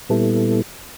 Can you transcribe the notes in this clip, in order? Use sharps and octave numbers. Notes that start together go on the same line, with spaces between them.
A#2 G3 B3 E4 A4